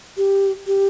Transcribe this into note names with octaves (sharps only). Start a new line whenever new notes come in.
G4
G4